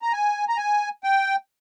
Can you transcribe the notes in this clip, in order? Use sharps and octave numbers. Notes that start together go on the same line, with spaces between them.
A#5
G#5
A#5
G#5
G5